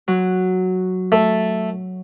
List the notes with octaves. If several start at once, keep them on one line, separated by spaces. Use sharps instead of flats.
F#3
A3